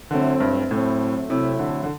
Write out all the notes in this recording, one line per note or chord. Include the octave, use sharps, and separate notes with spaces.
D3 F#3 A3 C4 E4
G2
A2 F#3 A3 C4 E4
C3 F#3 A3 C4 E4
D3
D3